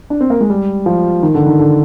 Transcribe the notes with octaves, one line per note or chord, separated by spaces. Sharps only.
D4
C4
A#3
G#3
G3
F3
D#3
D3
D#3
D3